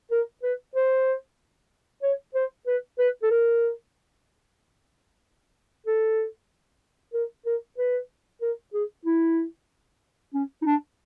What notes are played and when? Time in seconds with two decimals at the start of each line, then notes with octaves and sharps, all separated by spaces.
0.11 A#4
0.43 B4
0.75 C5
2.02 C#5
2.35 C5
2.67 B4
2.98 B4
3.22 A4
3.31 A#4
5.86 A4
7.13 A#4
7.46 A#4
7.78 B4
8.41 A#4
8.74 G#4
9.05 E4
10.34 C#4
10.62 D#4
10.65 D4